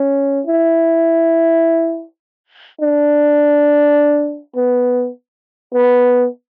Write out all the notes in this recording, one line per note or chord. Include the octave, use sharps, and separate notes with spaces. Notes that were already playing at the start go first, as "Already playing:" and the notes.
Already playing: C#4
E4
D4
B3
B3